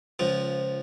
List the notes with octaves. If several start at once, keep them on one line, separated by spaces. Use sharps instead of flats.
C#2 F3